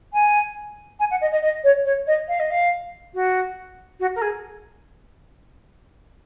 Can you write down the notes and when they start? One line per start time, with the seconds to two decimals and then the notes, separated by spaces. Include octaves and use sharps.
0.13 G#5
0.99 G#5
1.10 F#5
1.21 D#5
1.32 D#5
1.42 D#5
1.63 C#5
1.85 C#5
2.07 D#5
2.28 F5
2.39 D#5
2.50 F5
3.14 F#4
3.99 F#4
4.15 A#4
4.21 G#4